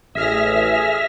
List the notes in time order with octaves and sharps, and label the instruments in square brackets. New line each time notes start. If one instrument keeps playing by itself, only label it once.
[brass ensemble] A1 [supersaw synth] G#4 F6 A#6 [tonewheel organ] E5